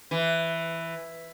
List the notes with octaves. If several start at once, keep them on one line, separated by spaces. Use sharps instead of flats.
E3